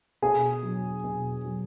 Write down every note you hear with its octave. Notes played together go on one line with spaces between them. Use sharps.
B2 G#4 G#5
F#3
B2
F#3